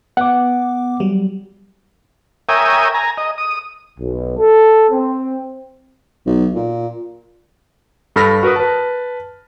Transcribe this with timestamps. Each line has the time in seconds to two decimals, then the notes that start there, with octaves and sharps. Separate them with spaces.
0.17 B3 F#5 D6
1.00 F#3 G3
2.49 A#4 C#5 E5 G5 G#5 D#6
2.94 G#5 A#5
3.18 D#5
3.38 D#6
3.99 B1
4.38 A4
4.90 C4
6.26 B1
6.55 A#2
8.16 G2 A4 B5 F6 A#6
8.43 F#4 A#4 B4 D#6
8.56 B4 A5